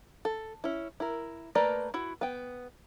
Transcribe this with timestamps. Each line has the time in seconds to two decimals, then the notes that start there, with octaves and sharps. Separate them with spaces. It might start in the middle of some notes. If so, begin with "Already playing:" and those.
0.25 A4
0.64 C#4 E4
1.00 E4 A#4
1.55 A3 A#3 A#4 B4 D5
1.94 E4 F#4
2.21 B3 G5